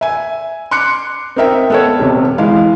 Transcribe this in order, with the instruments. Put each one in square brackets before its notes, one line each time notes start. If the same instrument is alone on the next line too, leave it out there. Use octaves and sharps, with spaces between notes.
[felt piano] E5 G#5
C6 D6 F#6 C#7
C4 D#4 A#4 E5 G5
B3 A4 C#5
D#1 C3
E3 G#3 F5